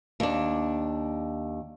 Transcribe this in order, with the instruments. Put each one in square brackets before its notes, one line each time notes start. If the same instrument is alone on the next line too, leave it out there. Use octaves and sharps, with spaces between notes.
[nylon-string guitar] D#2 D4